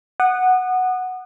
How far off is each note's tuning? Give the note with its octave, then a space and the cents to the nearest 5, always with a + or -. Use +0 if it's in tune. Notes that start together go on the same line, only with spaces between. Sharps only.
F#5 +0 D#6 -30